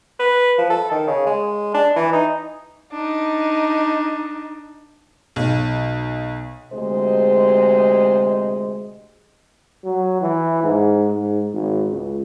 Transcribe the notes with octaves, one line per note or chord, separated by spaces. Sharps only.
B4
F3
A4
D#3
C#3
G#3
D4
E3
D#4
D4 D#4
B1
D2 C3 G#3 C5 D#5
F#3
E3
G#2
G#2
G#1
C#2